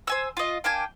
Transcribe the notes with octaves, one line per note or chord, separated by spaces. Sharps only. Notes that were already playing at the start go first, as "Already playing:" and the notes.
C5 G#5 E6
F4 D#5
A#3 D4 G5 G#5